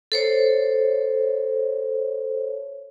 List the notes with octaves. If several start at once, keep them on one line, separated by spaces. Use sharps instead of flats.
A4 C5 C#5